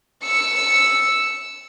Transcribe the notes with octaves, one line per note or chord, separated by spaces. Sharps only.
E6 C#7